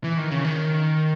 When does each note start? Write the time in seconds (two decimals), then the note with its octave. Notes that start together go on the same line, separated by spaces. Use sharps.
0.04 E3
0.18 D#3
0.31 C#3
0.45 D#3